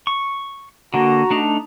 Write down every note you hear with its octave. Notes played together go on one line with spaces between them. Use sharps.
C#6
D3 A#3 F#4 A#5
A3 D4 D#4